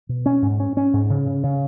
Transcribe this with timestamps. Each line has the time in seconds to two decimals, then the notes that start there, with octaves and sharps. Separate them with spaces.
0.09 B2
0.26 C#4
0.42 G#2
0.60 C#4
0.77 C#4
0.93 G#2
1.10 C#3
1.27 C#3
1.43 C#3